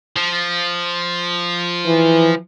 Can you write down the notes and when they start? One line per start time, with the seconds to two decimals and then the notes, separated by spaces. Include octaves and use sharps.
0.16 F3
1.86 E3